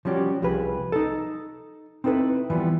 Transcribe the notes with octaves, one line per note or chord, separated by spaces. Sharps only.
F3 G3 C#4 F#4 G4
C2 F3 G4 G#4 B4
D#4 A4
C4 D#4 E4 A4 B4
E3 F3 G3 B3